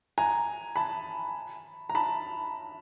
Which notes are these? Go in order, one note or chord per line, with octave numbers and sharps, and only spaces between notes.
G#5 A#5
A5 B5
A#5
A5 B5